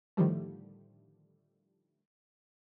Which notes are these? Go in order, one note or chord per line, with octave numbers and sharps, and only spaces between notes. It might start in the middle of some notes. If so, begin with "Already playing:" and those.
A2 D3 D#3 F3 G3 A3